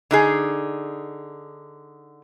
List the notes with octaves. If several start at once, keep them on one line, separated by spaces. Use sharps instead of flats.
D3 D#4 G#4